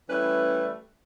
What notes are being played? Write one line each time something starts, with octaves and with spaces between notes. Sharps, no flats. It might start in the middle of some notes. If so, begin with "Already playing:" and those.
E3 G3 A3 C#4 B4